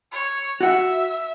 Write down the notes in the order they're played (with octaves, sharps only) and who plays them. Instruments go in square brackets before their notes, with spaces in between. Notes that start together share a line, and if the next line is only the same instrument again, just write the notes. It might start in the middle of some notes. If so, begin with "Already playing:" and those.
[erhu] C#5
[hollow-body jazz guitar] F#4 F#5 [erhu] E5